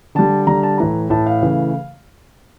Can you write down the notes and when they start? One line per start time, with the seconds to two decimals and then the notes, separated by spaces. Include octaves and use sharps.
0.15 D3 G3 A5
0.47 D3 G3 A#5
0.63 A5
0.78 A2 E3 A3 A#5
1.10 A2 E3 A3 A5
1.26 F5
1.42 C#3 E3 A3